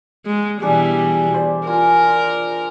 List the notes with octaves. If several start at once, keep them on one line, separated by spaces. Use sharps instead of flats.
G#3
B2 E3 G3 D4 G#4
C5 D5
F4 A#4 G#5